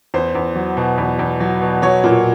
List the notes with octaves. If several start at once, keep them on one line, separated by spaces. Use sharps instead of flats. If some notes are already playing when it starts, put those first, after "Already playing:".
E2 C5
E2
F#3
B2
E2
E2
F#3
B2
F#3 C#5
A#2